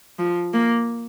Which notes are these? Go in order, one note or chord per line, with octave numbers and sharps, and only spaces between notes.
F3
A#3